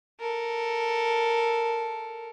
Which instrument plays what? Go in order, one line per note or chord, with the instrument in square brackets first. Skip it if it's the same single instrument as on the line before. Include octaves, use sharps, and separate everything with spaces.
[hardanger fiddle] A4 A#4